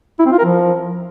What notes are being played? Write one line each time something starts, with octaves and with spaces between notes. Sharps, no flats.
E4
C4
F4
A#4
F3